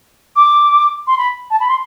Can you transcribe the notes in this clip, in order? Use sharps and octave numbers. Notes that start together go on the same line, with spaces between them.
D6
C6
B5
A5
B5
C6